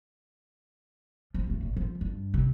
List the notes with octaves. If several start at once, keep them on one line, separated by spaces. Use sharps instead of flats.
F3
D#2 A3
A#1
F3
G2
C3